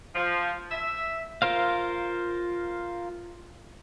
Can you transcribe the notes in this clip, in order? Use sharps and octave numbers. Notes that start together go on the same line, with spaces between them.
F3
E5
F4 A#4 C5 F5